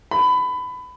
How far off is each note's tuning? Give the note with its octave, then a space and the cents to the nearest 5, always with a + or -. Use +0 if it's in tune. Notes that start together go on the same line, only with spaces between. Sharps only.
B5 +20